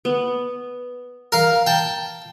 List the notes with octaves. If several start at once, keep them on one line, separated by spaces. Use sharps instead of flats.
B3
A#4 F5
G5 A5